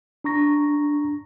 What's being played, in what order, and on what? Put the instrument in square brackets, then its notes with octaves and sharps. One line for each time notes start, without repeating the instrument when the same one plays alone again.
[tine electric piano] D4 A#5 C#6 A#6